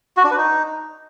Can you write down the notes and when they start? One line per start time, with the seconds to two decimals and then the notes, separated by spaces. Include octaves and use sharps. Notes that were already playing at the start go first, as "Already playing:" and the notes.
0.17 F#4
0.24 D4
0.31 B4
0.38 D#4